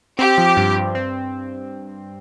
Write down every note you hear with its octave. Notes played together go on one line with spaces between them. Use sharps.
C4 G4
F3
G2
G2
C4